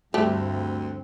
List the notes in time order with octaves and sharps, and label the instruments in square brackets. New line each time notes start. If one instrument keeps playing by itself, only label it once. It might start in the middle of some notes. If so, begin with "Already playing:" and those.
[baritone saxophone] D2 [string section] G2 [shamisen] A3 G4 [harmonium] C4